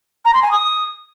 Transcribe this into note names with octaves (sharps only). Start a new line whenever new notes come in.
A#5
C6
G#5
D#6